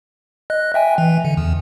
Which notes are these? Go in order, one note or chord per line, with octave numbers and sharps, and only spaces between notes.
D#5 F#6
E5 G5 G#5
E3
D3
E2